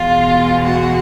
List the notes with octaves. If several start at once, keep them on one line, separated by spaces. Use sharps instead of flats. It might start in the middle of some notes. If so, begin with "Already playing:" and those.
Already playing: E2 B2 G#3 F4
F#4